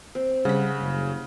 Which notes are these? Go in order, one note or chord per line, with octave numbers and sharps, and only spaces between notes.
C4
C#3 G3 F#5 B5
F#1